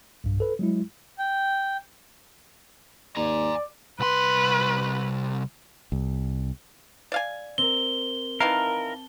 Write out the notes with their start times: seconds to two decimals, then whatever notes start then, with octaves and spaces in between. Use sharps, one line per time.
0.24 B1 G2
0.40 A4 B4
0.59 F#3 G#3 E4
1.19 G5
3.17 D#2 D5 G#5 A#5
4.00 C2 B4 C6
5.92 C2
7.12 D5 F5 G#5
7.58 C4 A#4 G7
8.40 D#3 E3 A#4 F5 A5